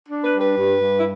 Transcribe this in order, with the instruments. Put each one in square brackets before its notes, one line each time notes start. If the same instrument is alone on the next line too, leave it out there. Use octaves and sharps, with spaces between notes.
[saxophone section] D4
B4
G3
B4
G2
G2
E4